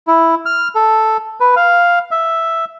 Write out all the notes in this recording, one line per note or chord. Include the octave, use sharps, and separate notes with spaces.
E4
F6
A4
B4
F5
E5